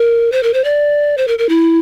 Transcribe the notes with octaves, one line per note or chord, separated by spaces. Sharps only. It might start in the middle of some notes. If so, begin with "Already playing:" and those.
Already playing: A#4
C5
A#4
C5
D5
C5
A#4
A#4
E4